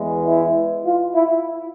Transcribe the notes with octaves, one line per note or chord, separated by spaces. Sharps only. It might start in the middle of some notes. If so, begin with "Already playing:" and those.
Already playing: E2 E3 G#3
E4
F4
E4